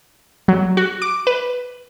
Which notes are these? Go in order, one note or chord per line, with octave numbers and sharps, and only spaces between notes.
F#3
F#4
D6
B4